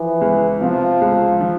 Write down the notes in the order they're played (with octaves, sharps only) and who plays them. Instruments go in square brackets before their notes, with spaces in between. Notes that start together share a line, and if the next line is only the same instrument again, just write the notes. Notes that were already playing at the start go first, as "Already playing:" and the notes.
Already playing: [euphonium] E3 [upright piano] F3
[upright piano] C#2
[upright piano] C3 [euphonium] F3
[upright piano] C#2
F3